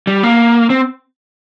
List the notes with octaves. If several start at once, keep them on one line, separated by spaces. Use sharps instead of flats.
G3
A#3
C4